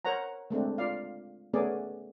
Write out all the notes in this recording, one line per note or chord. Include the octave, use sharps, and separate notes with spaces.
A#4 C5 C#5 F#5 A#5
G#3 A3 C4 D4
F4 D5 F5
A3 B3 C#4 G#4 D5